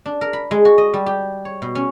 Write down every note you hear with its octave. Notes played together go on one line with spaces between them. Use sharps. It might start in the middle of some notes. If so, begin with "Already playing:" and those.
D4
A#4
B5
G#3
F#4
D#5
G3
G4
C#5
B2
C#4